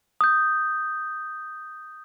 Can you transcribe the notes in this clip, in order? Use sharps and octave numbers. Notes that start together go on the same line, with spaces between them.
D#6 G6